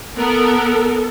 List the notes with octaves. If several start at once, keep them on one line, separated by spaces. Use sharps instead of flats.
B3 A4 A#4